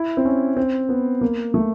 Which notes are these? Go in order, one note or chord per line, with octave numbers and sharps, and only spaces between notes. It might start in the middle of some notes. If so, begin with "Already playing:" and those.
Already playing: E4
C4
C#4
C4
B3
A#3
A3